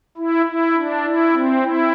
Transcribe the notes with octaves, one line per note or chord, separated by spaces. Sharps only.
E4
E4
D4
E4
C4
E4